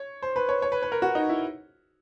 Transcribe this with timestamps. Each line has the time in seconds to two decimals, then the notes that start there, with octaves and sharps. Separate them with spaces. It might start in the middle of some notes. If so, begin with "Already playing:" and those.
Already playing: C#5
0.22 C5
0.36 B4
0.49 C#5
0.62 C#5
0.72 B4
0.82 B4
0.92 A#4
1.02 F#4
1.15 D#4
1.29 E4